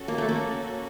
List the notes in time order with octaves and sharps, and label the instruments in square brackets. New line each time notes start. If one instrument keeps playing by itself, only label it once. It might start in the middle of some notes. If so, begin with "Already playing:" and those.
Already playing: [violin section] C#4 F#4 A4
[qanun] A#3
A3
A#3